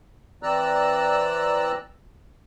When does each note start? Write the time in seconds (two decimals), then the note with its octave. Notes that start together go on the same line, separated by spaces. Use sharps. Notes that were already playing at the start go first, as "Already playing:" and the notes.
0.43 E3 C4 D5 A#5 E6 F#6